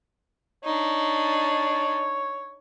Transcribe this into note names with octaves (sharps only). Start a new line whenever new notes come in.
D4 D#4 C#5